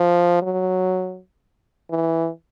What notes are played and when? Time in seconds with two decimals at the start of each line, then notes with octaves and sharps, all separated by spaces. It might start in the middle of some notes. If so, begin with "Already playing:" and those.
Already playing: F3
0.42 F#3
1.90 E3